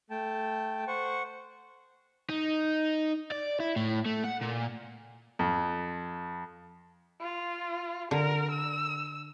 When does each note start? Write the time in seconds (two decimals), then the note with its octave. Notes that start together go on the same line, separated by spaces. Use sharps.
0.10 A3 G5 A5
0.87 C5 F#5 C#6
2.30 D#4
3.31 D5
3.60 E4
3.76 A2
4.05 A3
4.24 F#5
4.41 A#2
5.39 F2
7.21 F4
8.11 D3 A#4
8.51 E6